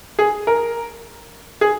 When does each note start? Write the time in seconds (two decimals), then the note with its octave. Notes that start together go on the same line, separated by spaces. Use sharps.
0.19 G#4
0.47 A#4
1.61 G#4